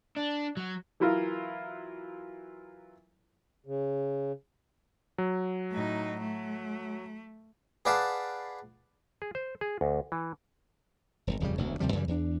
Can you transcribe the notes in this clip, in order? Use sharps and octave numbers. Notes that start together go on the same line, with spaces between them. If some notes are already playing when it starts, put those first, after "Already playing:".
D4
F#3
E3 F#3 E4 F4 A#4
C#3
F#3
A2 D#4
A3
G#4 B4 D5 F5 F#5 A5
G#4
C5
G#4
D2
E3
D#1 G#1
D#1 F2 C#3 G3
E1 D2 C3
D2 C3 F3 G3
F#2 C#3 E3 G3
E2 D4